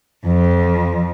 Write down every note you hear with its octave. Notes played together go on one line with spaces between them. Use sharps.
F2